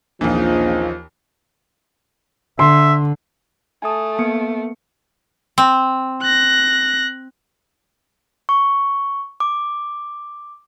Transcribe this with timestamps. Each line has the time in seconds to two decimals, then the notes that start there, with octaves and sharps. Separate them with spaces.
0.21 A#1 D#2 C#3 E3 F3 C4 D#4
2.59 D3 E5 C6
3.82 A3 G#5 A5 D#6
4.19 A#3 B3 C#7
5.58 C4
6.22 F#6 A#6
8.49 C#6
9.40 D6